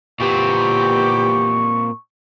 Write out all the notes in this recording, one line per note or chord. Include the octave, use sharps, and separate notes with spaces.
A#2 E3 B3 C4 G4 C#6